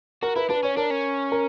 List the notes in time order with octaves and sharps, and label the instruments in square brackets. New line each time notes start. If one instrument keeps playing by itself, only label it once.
[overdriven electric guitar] F#4 [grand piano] A#4
[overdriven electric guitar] E4 [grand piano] B4
[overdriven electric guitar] D4 [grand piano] B4
[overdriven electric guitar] C#4 [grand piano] C#5
[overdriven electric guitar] D4 [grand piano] A#4
[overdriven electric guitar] C#4
[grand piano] A#4